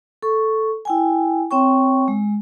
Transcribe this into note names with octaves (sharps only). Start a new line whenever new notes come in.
A4 C#6
E4 G5 G#5
C4 C#5 G5 C#6
G#3